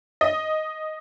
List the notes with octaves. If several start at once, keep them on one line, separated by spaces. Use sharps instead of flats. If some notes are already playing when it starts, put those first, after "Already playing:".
D#5